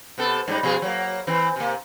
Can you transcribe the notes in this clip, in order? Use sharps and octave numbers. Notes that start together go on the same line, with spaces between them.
C3 B3 A4
G#2 G3 D#4
B2 F3 G#4
F#3 A#3
E3 C4
C3 A#3